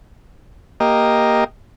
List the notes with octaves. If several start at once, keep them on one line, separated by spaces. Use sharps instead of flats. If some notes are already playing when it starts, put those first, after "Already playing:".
A#3 G4 D#5